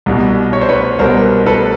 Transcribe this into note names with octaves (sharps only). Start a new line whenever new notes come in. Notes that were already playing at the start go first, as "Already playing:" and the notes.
C2 B2 G3
C#5
C5
B4 C#5
C2 B2 G3 A#4 C5
A4 B4